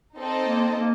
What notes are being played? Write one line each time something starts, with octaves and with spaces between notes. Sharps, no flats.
C4 D#4 A4 D#5
A#3
A#3